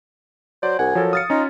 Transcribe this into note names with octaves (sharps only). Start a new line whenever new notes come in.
F#3 C5 D5
C2 F#5 G#5
F3 F#3 A4 A#4
F5 D#6 A6 C#7
C#4 D#4 F4